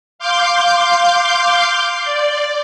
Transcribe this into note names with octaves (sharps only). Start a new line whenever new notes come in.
F5 C6 D6 G6
D5